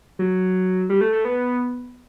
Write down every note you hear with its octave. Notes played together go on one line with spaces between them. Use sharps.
F#3
G3
A3
A3
B3